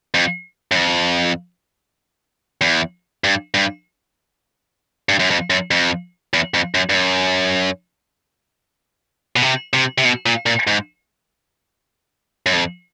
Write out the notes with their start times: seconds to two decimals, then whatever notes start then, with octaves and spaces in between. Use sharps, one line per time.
0.14 F2
0.71 F#2
0.76 F2
2.61 E2
3.24 G2
3.54 G2
5.09 G2
5.19 F#2
5.30 F2
5.50 F#2
5.71 F2
6.34 E2
6.54 F2
6.75 F#2
6.90 G2
6.95 F#2
9.36 B2
9.42 C3
9.73 C3
9.98 C3
10.05 B2
10.26 A#2
10.46 A#2
10.67 G#2
12.46 F#2
12.53 F2